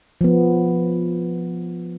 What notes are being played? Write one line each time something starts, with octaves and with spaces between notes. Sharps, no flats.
F3 B3